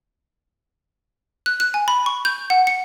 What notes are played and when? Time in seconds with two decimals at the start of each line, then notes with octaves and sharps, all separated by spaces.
1.46 F#6
1.60 F#6
1.74 G#5
1.88 B5
2.06 C#6
2.25 G6
2.50 F#5
2.67 C#7